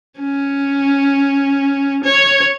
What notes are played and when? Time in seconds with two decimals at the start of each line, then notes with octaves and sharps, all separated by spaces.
0.20 C#4
2.04 C#5